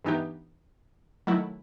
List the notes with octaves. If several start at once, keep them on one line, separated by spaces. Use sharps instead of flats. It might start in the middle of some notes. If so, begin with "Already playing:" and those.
G2 E3 B3 D#4 G4
D#3 F#3 A3 E4